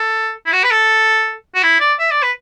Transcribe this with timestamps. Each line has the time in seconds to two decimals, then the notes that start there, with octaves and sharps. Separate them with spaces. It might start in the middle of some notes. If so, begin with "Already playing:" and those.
Already playing: A4
0.46 E4
0.52 F#4
0.63 B4
0.71 A4
1.55 F#4
1.63 E4
1.80 D5
1.99 E5
2.11 D5
2.23 B4